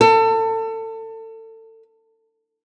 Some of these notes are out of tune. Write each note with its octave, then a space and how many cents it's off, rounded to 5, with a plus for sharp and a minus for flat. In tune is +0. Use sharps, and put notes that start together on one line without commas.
A4 +30